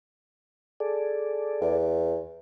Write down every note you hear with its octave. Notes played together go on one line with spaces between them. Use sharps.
G#4 A4 D5
E2